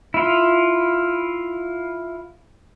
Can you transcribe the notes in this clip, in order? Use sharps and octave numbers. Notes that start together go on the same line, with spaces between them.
E4 F4